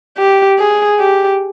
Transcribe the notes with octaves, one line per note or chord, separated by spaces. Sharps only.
G4
G#4
G4